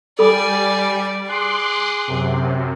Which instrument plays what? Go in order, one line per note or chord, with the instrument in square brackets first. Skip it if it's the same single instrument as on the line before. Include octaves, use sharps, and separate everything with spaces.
[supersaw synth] G3 [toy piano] A4 B5 D6 [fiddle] D5 G#5
[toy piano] B5
[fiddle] G#4 [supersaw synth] C6 D6 F#6
[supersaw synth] F#2 C3